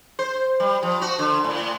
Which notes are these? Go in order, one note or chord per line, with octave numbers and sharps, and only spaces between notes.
C5
G3
F3
F#4
D3
A2